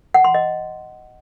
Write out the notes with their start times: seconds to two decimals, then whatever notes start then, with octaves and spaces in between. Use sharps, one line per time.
0.14 F#5
0.24 C6
0.35 D#5